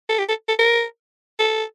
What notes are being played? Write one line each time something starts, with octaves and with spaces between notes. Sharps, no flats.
A4
G4
A4
A4
A#4
A4